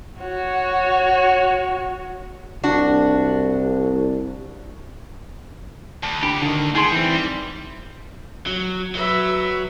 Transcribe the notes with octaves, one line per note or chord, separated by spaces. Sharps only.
F#4 C#5
C2 D4 F#4
D2 A5
D4 G4 B5
D3 D#3
G3 D#4 G#4 C6
E3 C4
F#3
F#3 B4 E5